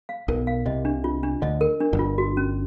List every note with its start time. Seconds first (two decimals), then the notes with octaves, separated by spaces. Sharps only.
0.09 F5
0.28 B1 B2 A#4
0.47 F5
0.66 C2 C3 D#5
0.85 D4
1.04 F4
1.23 D4
1.42 D2 D3 D#5
1.61 A#4
1.80 D4
1.93 G1 G2
1.99 F4
2.18 F#4
2.37 C#4